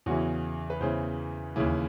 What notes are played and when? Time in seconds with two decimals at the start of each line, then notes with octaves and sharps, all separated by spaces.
0.06 E2 C#3 E3 F#4
0.70 B4
0.80 E2 C#3 E3 C5
1.56 D#2 C#3 E3